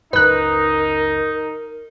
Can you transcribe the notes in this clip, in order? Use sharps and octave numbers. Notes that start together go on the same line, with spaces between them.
F#1 C#2 D#4 A#4 B4 F#6